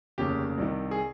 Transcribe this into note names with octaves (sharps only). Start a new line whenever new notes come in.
F1 D#2 C#3 G4
C2 C3 D#3
G#4